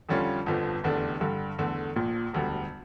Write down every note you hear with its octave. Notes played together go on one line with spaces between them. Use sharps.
F2 D3 G3 C#4 F4
G1 F2 D3 F3
F1 E2 D3 A3 D4
G2 D3 G3
E2 D3 A3
A#1 A#2 F3
E1 D2 D3 G3